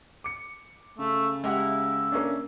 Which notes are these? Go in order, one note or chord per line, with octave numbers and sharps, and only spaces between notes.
D6 C#7
C#3 A3
G#3 E4 G4 A#4 E5 F#5
A#3 C#4 D4